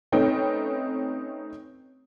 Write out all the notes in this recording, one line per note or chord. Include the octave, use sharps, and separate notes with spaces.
A3 C4 C#4 D#4 B4 G5